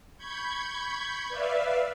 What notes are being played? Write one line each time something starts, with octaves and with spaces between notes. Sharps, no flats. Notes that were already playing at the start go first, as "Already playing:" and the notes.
B5 C#6 G6 G#6
B4 D5 E5 F5